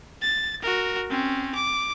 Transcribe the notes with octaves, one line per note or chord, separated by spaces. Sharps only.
A6
F#4 A#4
C4 C#4
D6